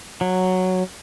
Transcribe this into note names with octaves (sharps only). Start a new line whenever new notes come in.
F#3